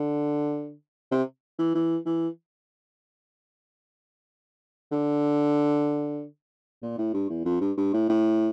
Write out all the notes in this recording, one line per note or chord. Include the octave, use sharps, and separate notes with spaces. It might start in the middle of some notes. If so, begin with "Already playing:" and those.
Already playing: D3
C3
E3
E3
E3
D3
A#2
A2
G2
E2
F2
G2
G2
A2
A2